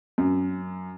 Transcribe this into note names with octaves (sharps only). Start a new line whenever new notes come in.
F#2